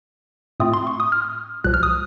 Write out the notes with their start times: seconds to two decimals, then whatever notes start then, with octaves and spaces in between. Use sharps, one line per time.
0.60 A2 A3 C4 F4 D#6
0.73 C6
0.87 C#6
1.00 D#6
1.12 F6
1.64 C2 A#2 F3 F#6
1.74 F6
1.83 D#6